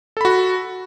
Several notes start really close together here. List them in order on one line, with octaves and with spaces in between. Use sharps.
A4 B5 F#4